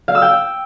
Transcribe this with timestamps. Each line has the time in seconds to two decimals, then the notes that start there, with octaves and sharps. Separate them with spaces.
0.08 F5
0.15 E6
0.22 G5